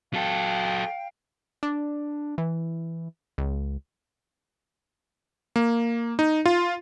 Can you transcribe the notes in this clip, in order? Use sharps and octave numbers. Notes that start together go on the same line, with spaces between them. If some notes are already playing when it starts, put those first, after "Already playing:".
F#3 A4 F5 G5
D4
E3
C#2
A#3
D#4
F4